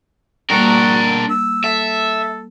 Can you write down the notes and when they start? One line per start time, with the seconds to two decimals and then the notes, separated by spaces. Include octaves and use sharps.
0.50 G3 A#3 D4 F#4 A#4
1.30 E6
1.64 A4 E5